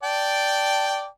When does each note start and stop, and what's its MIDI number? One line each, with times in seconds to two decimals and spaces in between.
0.03 1.06 74
0.03 1.06 79
0.03 1.06 81